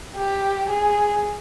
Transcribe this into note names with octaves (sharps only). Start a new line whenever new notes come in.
G4
G#4